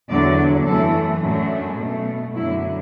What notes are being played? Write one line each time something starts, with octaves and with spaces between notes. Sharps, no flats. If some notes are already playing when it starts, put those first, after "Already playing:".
E2 D3 F#3 D5
F#2 E3 A3 A4
F#2 F#3 A3 D4
B2 A3
F#2 D3 F#3 E4